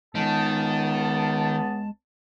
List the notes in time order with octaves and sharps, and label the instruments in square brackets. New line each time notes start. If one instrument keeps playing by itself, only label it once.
[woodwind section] C#2 B3 A5 [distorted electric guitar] D#3 [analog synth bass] G#3